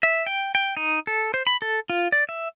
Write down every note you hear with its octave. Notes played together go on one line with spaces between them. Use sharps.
E5
G5
G5
D#4
A4
C5
B5
A4
F4
D5
E5